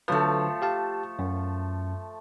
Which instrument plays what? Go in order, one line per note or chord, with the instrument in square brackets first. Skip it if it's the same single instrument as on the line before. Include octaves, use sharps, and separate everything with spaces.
[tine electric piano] D3 F#3 B4 [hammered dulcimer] F3 A3
[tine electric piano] G4 F5 A5
F#2